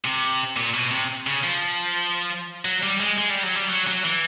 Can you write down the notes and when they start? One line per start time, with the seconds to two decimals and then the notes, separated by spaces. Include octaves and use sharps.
0.05 C3
0.56 A#2
0.74 B2
0.91 C3
1.27 C#3
1.44 F3
2.65 F#3
2.83 G3
3.00 G#3
3.18 G#3
3.30 G3
3.43 F#3
3.56 G3
3.70 F#3
3.87 F#3
4.05 E3